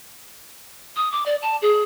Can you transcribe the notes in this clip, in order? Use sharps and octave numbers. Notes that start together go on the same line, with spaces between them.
D#6
D6
D5
A5
G#4